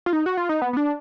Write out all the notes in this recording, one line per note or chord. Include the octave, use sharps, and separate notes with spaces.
F4
D#4
F#4
F4
D#4
B3
B3
D4